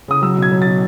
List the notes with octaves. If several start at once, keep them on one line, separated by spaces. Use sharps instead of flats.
C#3 D#6
F#3 E6
B2
G#6
F#3
B2 A6